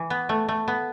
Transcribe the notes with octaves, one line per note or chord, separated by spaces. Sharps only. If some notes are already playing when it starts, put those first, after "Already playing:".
Already playing: E3
B3
A3
A3
B3